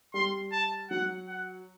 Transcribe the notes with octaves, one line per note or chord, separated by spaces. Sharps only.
G3 C6
A5
F#3 F#5
F#5